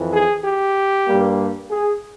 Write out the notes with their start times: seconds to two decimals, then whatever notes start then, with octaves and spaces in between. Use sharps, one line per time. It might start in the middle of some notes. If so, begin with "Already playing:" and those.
Already playing: F2 E3
0.12 G#4
0.44 G4
1.08 G2 G3 A#3
1.71 G#4